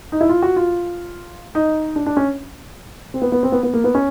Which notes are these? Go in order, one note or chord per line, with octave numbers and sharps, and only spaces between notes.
D#4
E4
F4
F#4
F4
D#4
D4
D4
C#4
C4
B3
B3
C4
B3
B3
A#3
B3
C#4